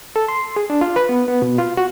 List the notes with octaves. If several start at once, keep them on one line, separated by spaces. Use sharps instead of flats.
A4
C6
G#4
D4
F4
B4
B3
B3
B2
F4
F#4